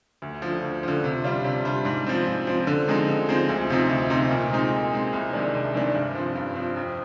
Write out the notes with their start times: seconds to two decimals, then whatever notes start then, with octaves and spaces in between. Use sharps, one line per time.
0.22 D2
0.42 D3 F3
0.62 D2
0.83 D3 F3
1.04 C3
1.24 G3 D4 F4
1.45 C3
1.65 G3 D4 F4
1.85 G#2
2.07 F3 C4
2.27 G#2
2.47 F3 C4
2.67 D3
2.88 F3 G#3 C4 D#4
3.09 D3
3.29 F3 G#3 C4 D#4
3.49 D2
3.70 C3 F3 C4 D#4
3.90 D2
4.10 C3 F3 C4 D#4
4.31 A#2
4.52 G#3 C4 D#4
4.72 A#2
4.92 G#3 C4 D#4
5.13 C2
5.33 C3 D#3 G#3 D4
5.54 C2
5.74 C3 D#3 G#3 D4
5.95 G2
6.15 F3 C4
6.35 G2
6.56 F3 C4
6.76 F2